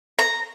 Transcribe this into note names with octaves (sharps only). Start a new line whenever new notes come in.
A#5